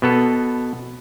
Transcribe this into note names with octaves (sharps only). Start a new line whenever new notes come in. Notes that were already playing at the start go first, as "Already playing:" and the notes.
B2 B3 A4